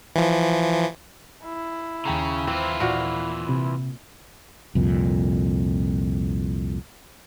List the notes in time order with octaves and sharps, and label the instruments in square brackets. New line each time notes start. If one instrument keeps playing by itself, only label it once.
[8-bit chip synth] E3 F3
[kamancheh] E4
[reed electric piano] D#2 G5 A#5 [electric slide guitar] C#3 C#4
[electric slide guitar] E3 F4 [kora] C4
[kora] A#2 F#4
[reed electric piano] C3
[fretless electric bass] C2 F2 A#2